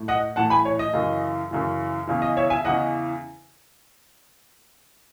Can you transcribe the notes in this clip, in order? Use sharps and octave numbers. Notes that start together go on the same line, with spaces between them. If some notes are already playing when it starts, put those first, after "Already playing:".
Already playing: A2
D#5 F#5
A2 E3 F#5 A5
G#5 B5
C#5
D#5
F#2 C#3 E3
F#2 C#3 E3
E2 C#3 E3
D#5
C#5 E5
E5 G#5
E2 C#3 E3 D#5 F#5